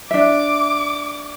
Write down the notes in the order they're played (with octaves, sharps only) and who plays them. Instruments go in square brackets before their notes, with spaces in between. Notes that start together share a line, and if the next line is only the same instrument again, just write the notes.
[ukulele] D4 E5 [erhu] D6